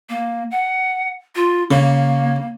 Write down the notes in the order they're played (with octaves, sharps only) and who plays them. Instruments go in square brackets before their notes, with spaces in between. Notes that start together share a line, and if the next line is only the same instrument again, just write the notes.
[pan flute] A#3
F#5
F4
[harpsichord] C#3 [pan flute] A#3